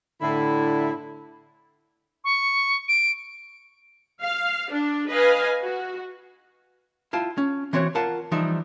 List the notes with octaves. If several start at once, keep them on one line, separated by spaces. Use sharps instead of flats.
A2 D3 E4
C#6
D7
F5
D4
B4 D#5 F5 G#5
F#4
E4 F4 G5 A5
C#4
E3 C4 F#4 C#5
F4 A#4 F#5 A5
E3 F3 G3 D#4 E5